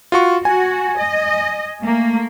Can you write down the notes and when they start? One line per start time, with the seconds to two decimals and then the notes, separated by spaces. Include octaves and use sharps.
0.12 F4 F#4 C#6
0.45 F#4 G#5
0.99 D#5
1.81 A3 A#3